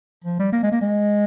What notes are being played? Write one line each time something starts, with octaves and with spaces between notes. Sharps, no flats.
F3
G3
A#3
G#3
A#3
G#3